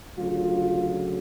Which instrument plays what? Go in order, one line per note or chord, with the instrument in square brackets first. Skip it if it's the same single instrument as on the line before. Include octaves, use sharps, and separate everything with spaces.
[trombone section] D2 C#3 F#3 F4